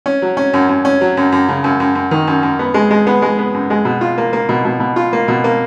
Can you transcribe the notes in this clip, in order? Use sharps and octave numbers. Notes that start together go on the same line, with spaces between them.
C#4
F#3
C#4
F#2
F#2
C#4
F#3
F#2
F#2
C#3
F#2
F#2
F#2
D#3
F#2
F#2
B3
G#3
G#3
B3
G#3
B3
F#2
G#3
B2
F4
A#3
A#3
B2
B2
B2
F4
A#3
B2
A#3